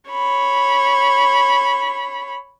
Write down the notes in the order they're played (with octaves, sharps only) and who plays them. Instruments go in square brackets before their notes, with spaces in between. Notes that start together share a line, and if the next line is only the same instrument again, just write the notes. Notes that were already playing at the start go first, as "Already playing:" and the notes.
[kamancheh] C#5 B5